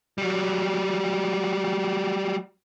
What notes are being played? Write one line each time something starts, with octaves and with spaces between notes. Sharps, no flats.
F#3 G3